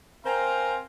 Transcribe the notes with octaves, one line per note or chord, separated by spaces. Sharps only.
C4 A#4 C5 F5 G#5 A#5